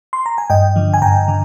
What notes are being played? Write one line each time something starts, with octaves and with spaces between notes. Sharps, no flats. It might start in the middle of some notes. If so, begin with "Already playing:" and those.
C6
A#5
G#5
G2 D#5 G5
D3 F3
G#5
G2 G5 A#5
D3